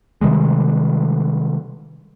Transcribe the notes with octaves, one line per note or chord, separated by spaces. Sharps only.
C3 D#3 G3 G#3